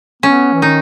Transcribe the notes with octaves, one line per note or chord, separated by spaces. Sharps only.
B3 C#4
E3
D#3 D#4